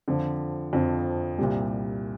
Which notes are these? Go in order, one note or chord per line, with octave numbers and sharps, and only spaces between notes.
F2 D3 F3
F2 D3 F3
C2 A#2 G3